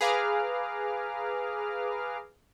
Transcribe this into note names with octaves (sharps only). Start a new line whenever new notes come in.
G#4 B4 F5 A#5 D6 F6